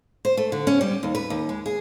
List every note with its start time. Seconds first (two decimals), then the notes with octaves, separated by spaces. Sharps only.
0.25 C5
0.37 A3
0.52 D3
0.67 C#4
0.81 G3
1.03 D#2
1.15 B4
1.30 D#2
1.49 G#3
1.66 G#4